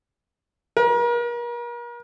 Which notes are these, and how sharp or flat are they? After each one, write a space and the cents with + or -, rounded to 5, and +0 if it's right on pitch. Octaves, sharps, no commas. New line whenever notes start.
A#4 +40